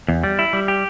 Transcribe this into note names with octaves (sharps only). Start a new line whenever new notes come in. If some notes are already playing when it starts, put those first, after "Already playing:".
E2
G3
E4
G3
G4